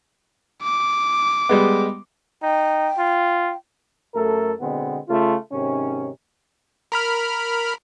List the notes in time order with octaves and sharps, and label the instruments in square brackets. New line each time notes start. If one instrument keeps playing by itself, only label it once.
[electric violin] D6
[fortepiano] G3 G#3 B3
[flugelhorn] D#4 [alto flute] G5
[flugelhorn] F4
[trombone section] F#2 A3 A4 A#4
B2 D3 G#3 B3 C4
C#3 A3 F4
G#2 C3 D#3 C#4
[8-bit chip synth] A#4 B5 F6